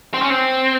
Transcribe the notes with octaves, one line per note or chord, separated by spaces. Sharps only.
C4
C#4
C4